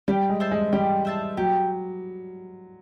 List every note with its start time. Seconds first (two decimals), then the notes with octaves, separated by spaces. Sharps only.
0.08 G3 G4
0.29 G#3
0.40 C5 E5 A5
0.51 G#3
0.73 G3 G4
1.05 C5 E5 A5
1.37 F#3 G4